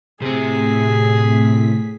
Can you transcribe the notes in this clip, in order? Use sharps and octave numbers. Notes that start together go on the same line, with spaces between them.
A2 C3 C4 G#4 B6